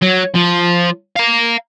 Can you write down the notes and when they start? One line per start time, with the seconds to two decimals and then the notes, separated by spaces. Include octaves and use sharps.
0.02 F#3
0.35 F3
1.16 F5 A#5